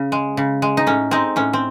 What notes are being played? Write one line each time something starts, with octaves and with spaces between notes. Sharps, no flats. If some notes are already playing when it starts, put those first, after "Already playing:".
Already playing: C#3 C#4
G#3
C#3
G#3
D#4
A2 C#4
G#3 C4 D#4
A2 C#4
C4